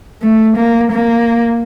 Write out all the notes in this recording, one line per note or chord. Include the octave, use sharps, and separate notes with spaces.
A3
A#3
A#3